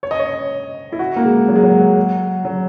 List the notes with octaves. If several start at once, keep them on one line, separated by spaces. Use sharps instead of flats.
C#5
D#5
C#5
E4
F#4
A#3
G#3
F#3
G#3
F#3
F#3